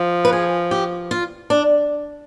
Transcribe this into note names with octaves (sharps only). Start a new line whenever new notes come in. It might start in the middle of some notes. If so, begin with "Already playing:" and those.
Already playing: F3
B4
G#4
G4
F4
D4